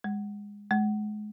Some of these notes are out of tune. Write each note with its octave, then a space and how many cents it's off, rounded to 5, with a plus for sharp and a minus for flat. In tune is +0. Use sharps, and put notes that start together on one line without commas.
G#3 -20
G#3 +30